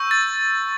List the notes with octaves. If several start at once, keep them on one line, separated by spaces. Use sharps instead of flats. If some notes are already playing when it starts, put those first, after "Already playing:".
Already playing: C#6 E6 G6
A6